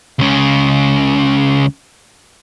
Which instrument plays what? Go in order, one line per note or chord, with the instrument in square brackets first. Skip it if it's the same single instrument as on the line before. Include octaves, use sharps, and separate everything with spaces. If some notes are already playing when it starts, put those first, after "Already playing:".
[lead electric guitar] C#2 C#3